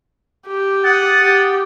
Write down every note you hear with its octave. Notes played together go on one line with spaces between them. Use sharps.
G4
F#5 D#6 A6
G4